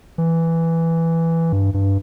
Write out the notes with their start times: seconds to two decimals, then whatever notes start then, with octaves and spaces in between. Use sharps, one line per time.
0.18 E3
1.53 G2
1.74 G2